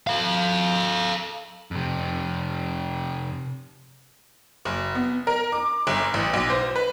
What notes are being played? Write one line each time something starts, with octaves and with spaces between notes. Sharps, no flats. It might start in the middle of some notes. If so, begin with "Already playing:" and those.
A4 F5
F2 C3
F#1
B3
A#4
D6
G1
A1
B1
C5
B4